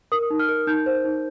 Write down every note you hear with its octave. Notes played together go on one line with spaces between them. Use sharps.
A#4 D#6
D#4
F6
A#4
D#4 G6
C5
D#4